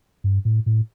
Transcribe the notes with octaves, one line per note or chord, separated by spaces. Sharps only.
G2
A2
A2